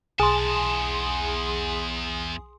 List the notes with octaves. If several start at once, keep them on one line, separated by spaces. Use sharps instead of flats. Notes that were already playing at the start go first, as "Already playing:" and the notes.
B1 E2 G#4 G#5 A5 C6 D#6